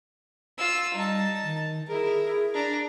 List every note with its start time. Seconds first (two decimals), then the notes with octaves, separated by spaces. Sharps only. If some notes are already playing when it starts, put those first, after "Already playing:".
0.58 F4 E6
0.94 G3 D#4 A5
1.44 D#3
1.88 E4 G#4 A#4
2.54 D4 A#5